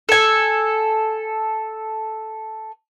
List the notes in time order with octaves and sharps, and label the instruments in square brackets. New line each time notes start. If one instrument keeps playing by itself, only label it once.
[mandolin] A4 G#5